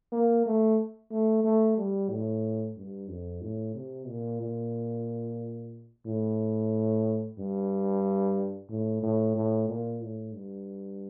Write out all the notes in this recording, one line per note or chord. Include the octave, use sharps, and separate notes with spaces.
A#3
A3
A3
A3
G3
A2
G2
F2
A2
C3
A#2
A#2
A2
G2
A2
A2
A2
A#2
A2
G2